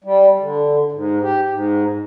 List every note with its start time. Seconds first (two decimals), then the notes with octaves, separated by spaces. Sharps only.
0.04 G3
0.40 D3
0.92 G#2
1.22 G4
1.50 G#2